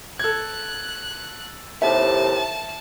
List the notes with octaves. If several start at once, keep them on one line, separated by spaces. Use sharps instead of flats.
A4 F#6 G#6
D#2 A2 C3 E5 A5